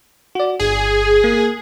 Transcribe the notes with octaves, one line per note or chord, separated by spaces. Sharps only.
F#4 D5
G1 G#4
A#3 C7